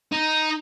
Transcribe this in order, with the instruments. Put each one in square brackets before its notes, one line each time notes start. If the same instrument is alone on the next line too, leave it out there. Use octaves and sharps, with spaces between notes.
[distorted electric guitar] D#4